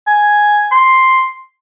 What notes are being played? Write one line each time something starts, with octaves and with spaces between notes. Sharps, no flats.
G#5
C6